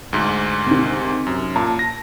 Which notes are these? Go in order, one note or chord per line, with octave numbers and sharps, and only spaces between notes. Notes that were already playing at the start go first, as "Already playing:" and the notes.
D2 G#2
C3 D#3
F#2
A#2 A5
A#6